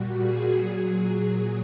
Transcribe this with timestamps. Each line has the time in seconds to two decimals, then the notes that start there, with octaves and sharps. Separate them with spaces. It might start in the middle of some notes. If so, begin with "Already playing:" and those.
Already playing: A#2 G3 F#4
0.20 G#4
0.58 A#2 F#3